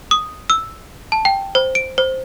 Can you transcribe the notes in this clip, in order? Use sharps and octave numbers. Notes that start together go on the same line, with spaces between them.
D#6
E6
A5
G5
C5
D7
C5